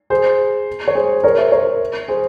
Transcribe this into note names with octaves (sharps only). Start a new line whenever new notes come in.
G#4 C5
C#5
G#4 C5
A#4 C#5
C5 E5
A#4 C#5
G#4 C5